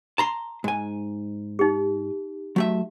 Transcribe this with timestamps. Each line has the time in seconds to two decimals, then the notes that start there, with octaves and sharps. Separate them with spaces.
0.18 A5 A#5 C6
0.64 G#2 G#5
1.59 D#4 G4
2.56 F#3 A3 E5